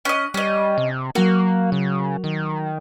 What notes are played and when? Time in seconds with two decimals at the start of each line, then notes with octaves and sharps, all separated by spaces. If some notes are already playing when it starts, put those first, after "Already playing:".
0.05 C#4 D#5 F#6
0.34 G3 C#4 D#5
0.78 C3
1.15 F#3 A#3 F#4 A#4
1.72 C#3
2.24 D#3